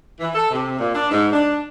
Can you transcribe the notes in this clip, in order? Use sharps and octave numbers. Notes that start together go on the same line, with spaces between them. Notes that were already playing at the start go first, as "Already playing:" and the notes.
E3
A4
C3
A#2
D4
G#2
D4